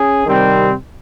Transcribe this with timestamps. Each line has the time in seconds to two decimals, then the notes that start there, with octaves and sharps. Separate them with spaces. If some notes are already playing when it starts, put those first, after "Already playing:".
Already playing: C#4 G#4
0.27 C3 D#3 G3 C4